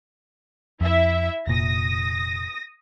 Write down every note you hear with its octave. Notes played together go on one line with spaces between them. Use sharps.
F2 E4 E5
F1 A#2 D#6 A#6